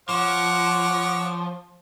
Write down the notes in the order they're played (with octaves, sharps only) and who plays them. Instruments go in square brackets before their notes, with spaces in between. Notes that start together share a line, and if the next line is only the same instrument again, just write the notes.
[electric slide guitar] F3 [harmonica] C#5 F#5 D6